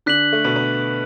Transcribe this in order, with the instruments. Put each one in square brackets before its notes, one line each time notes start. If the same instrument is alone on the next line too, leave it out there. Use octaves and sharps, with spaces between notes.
[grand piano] D3 D4 [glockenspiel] F#6 B6 F#7
[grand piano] A3
B2 B3
B3